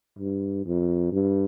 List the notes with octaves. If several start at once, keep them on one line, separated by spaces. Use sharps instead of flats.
G2
F2
G2